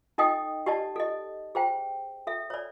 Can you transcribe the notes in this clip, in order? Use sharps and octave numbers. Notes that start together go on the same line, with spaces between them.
D#4 A4 D#5 G5 D#6
G4 D5 D#5 A5
A4 D#5
G#4 C5 G5
A4 E5
C#5 D5